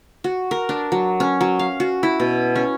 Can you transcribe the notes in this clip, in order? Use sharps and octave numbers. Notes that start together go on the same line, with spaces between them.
F#4
A#4
D4
F#3
C#4
F#3
F5
F#4
E4
B2
C#4